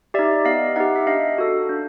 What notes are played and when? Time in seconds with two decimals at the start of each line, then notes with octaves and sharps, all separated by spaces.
0.14 D#4 G4 D5 E5
0.45 B3 D#5 F5
0.76 D#4 G4 E5 F#5
0.96 E5
1.07 D4 D#5 F5
1.38 F#4 A4
1.69 D4